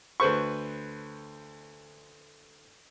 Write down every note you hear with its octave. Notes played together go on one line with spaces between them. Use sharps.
D2 B4 C5 C#6